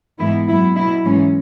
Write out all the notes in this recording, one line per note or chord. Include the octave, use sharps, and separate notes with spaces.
G#2 E3 G#3 B3 E4
F#2 F#3 B3 E4
B2 F#3 B3 E4
G#2 E3 G#3 C#4